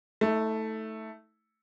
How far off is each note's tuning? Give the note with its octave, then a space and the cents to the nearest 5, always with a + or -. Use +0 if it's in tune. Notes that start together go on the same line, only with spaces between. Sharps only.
A3 +0 D#4 +45